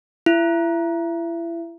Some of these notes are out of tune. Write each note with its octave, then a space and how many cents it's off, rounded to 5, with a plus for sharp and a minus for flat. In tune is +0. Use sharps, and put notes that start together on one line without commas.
E4 +30